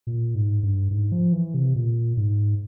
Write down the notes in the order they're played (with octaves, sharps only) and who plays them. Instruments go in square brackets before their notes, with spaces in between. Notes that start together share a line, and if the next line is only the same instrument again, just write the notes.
[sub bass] A#2
G#2
G2
G#2
F3
E3
C3
A#2
G#2